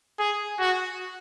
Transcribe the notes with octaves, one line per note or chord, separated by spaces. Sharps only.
G#4
F#4